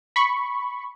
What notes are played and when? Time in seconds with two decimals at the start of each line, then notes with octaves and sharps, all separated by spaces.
0.16 B5 C#6